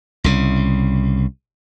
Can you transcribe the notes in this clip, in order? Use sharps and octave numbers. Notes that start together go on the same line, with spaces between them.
C2 C#3